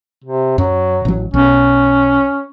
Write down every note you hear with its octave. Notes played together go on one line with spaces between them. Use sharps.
C3
F#2 F#3
A1 F#3
B1 C#4